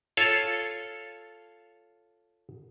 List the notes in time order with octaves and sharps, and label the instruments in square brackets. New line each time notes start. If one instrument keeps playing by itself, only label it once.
[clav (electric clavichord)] F4 A4 C#5 F5